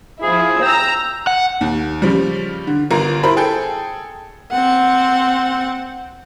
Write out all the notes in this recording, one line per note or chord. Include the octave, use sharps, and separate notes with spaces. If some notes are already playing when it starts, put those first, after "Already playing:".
F3 E4 G#4
G5 A#5 E6
F#5
D#2
C#3 F3 G3
D3
G1 F4 A#4 A#5
E4 A#4 C5 B5
G#4 A4 G5
C4 F#5